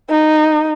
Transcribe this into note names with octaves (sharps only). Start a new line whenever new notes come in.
D#4